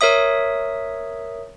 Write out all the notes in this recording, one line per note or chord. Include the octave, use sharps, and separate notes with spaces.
A#4 C#5 E5 D#6